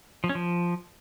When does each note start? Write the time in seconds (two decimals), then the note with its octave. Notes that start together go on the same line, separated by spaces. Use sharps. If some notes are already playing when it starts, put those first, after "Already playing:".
0.24 F3
0.29 C#4
0.35 F3